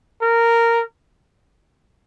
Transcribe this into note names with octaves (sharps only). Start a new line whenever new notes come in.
A#4